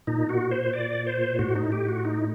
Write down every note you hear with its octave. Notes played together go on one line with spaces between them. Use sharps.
A#2 D#4
F#4
C5
D5
C5
A2 F#4
D#4
G4
F#4
D#4